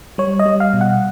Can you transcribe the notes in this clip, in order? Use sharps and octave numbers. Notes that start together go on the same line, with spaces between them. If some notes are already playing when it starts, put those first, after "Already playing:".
G3 C#5
D#5
G3
F5
B2
F#5